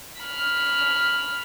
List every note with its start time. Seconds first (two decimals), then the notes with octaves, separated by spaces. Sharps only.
0.21 B5 F6